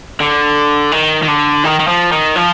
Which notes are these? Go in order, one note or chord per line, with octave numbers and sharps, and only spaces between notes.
D3
D#3
D#3
D3
D#3
D#3
F3
D#3
F3